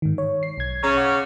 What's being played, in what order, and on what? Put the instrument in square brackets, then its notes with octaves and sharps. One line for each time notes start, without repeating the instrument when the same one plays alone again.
[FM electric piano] G#2 D#3
C#5
C7
B1 G#6
[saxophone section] C#3 C#4 [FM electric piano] A#5 G#6
[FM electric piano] F#5 C#6 D6